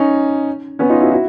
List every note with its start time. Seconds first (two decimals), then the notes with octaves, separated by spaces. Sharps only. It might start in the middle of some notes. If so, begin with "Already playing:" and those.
Already playing: C#4 D#4
0.79 B3 C#4
0.90 D#4 F4
1.01 E4 F#4
1.11 E4 F#4